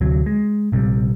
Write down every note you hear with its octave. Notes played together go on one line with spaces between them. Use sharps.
D2 C3 F#3
G#3
A#1 C3 F3 G3